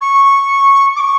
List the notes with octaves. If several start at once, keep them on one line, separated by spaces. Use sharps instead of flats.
C#6
D6
C#6